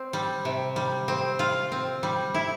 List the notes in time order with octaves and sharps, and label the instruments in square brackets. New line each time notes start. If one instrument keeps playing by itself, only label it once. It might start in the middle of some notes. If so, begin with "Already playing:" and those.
Already playing: [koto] C4
G3
C3
G3
C4
F4
C4
G3
E4